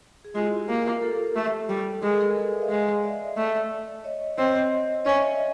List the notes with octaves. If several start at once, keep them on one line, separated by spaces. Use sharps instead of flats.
G#4
G#3 F4 G4
E4 F#4
F4 G4
A#3
A#4
G4 A4
A3
G3
G#3 A#4
A4
G#4 A#4
A4 B4
D5 E5
D#5 F5
G#3
D5 E5
A3
C#5 D#5
C4 C#5 D#5
C#4 C#5 D#5
D5 E5
C#5 D#5